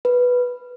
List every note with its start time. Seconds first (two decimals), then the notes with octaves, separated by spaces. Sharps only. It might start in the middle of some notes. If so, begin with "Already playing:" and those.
0.05 B4